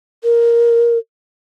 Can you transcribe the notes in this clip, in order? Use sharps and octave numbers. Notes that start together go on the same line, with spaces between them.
A#4